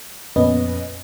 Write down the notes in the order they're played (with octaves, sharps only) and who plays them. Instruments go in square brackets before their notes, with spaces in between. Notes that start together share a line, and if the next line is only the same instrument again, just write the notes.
[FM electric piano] F2 A#2 B3 C#4 B4 D#5